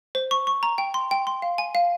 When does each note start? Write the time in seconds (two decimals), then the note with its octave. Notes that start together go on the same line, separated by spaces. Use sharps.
0.15 C5
0.31 C#6
0.47 C#6
0.63 A#5
0.78 G5
0.94 C6
1.11 G5
1.27 C6
1.42 F5
1.58 G#5
1.75 F5